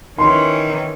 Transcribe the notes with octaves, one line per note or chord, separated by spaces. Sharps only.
D#3 E3 C#4 C6